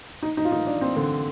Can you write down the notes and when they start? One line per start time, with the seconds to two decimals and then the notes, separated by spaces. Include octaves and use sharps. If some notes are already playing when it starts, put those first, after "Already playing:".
0.22 D#4
0.37 D#4
0.45 F4
0.52 D#4
0.67 D4
0.81 C4
0.97 D3